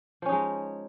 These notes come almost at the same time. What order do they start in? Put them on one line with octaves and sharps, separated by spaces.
F3 C#4 D#4 G#3